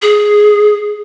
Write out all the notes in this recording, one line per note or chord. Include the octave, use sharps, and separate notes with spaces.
G#4